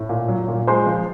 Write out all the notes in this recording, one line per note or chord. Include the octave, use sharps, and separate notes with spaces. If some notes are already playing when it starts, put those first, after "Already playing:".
Already playing: A2
A#2
F#3
A#2
G#3 C5 C6
F3